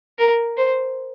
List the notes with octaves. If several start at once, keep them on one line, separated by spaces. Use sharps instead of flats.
A#4
C5